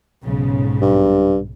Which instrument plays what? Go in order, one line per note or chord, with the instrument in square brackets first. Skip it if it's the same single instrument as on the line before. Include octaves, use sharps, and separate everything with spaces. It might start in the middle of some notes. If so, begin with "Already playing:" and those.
[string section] B1 G#2 C#3
[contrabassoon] G2